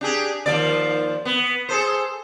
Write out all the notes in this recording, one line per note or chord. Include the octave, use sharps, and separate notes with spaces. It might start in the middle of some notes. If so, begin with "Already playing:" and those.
D4 G4 G#4
D#2 F3 D5
B3
G#4 A4 C5